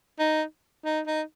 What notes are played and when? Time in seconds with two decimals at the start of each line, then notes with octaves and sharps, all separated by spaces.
0.19 D#4
0.85 D#4
1.07 D#4